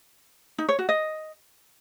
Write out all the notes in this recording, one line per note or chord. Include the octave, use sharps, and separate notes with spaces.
D#4
C#5
F#4
D#5